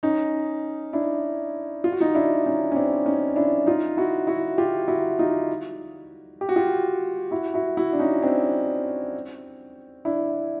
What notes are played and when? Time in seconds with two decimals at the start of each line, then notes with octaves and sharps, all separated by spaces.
0.03 C#4 D#4
0.93 D4 E4
1.84 F4
1.92 F#4
2.01 D#4 F4
2.14 D4 E4
2.46 C#4 D#4
2.72 C#4
2.76 C4 D4
3.06 C#4 D#4
3.36 D4 E4
3.66 D#4 F4
3.97 E4 F#4
4.27 E4 F#4
4.58 F4 G4
4.88 E4 F#4
5.19 D#4 F4
6.41 G4
6.49 F#4
6.56 F4 G4
7.31 E4 F#4
7.54 E4 F#4
7.77 E4 F#4
7.93 D4
7.99 C#4 D#4
8.23 C4 D4
10.05 D4 E4